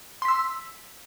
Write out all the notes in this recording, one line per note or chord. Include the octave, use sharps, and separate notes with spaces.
C6 E6 B6